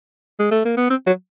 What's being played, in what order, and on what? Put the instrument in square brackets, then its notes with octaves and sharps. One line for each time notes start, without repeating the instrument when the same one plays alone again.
[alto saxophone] G#3
A3
A#3
B3
C4
F#3